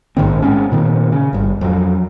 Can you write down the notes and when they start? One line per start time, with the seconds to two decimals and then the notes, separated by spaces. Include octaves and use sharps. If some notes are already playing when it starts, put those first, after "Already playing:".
0.17 A#1 G#2 D#3 C4
0.42 G#3 C4 C#4
0.72 A#2 D#3 C4
1.12 C#3
1.33 G#1 G2
1.61 F2 F#3